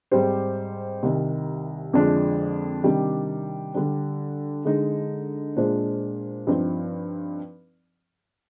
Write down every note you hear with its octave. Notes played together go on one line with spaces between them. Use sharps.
G#2 G3 C4 G4 C5
C2 C3 D#3
F2 D3 F3 G#3 D4
C3 D#3 G3 D4 G4
D3 G3 D4
D3 G#3 D#4
A#2 G#3 D4 F4 C5
G2 F3 C4 D#4